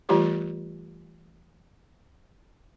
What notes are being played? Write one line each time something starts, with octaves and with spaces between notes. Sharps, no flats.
E3 G3 A3 F4 G4 C#5